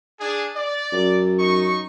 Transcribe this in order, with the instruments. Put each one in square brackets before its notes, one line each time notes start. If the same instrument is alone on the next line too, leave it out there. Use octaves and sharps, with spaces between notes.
[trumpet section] D4 G#4
D5
[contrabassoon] F#2
[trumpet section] D#4 C#6